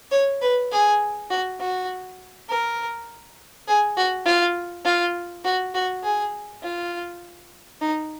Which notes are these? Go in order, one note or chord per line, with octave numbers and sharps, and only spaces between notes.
C#5
B4
G#4
F#4
F#4
A#4
G#4
F#4
F4
F4
F#4
F#4
G#4
F4
D#4